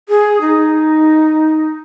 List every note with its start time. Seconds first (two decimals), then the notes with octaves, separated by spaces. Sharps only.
0.09 G#4
0.41 D#4